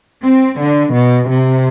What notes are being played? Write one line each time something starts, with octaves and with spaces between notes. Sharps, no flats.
C4
D3
B2
C3